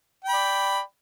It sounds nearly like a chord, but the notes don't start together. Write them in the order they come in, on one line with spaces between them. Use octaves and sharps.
G5 B5 D5